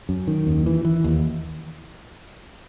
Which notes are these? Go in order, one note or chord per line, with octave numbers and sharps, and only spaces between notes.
F#2
D#3
D#2
E3
E3
D#2